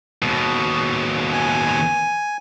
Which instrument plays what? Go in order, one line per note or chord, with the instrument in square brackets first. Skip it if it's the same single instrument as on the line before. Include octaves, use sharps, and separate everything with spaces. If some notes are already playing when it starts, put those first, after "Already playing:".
[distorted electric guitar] D#2 B2
[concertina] G#5